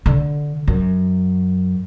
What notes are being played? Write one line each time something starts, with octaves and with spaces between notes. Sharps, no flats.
D3
F#2